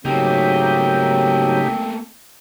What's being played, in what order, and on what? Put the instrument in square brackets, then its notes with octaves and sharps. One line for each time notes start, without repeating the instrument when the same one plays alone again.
[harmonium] G#2 F#3 [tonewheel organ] C#3 D#4 G4 [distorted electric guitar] A3 A#3 [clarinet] C4